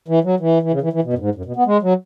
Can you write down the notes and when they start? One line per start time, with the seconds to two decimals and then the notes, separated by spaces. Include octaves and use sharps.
0.08 E3
0.24 F#3
0.40 E3
0.62 E3
0.72 C#3
0.82 E3
0.93 E3
1.04 B2
1.13 F#2
1.19 G#2
1.35 F#2
1.45 B2
1.56 B3
1.66 G#3
1.82 F#3